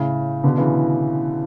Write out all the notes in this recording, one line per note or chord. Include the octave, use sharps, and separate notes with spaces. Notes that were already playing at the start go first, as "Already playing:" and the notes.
Already playing: A2 C#3
B2 D3
C#3 E3